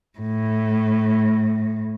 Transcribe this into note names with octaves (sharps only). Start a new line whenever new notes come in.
A2